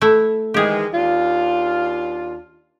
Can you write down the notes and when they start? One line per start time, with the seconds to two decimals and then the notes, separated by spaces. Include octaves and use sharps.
0.02 A3 E4
0.54 D#3 E3 G#3 G4 G#4
0.93 D#2 D4 F4